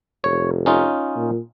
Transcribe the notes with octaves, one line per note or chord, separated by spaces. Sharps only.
F1 C#5
C#4 D#4 F4
A#2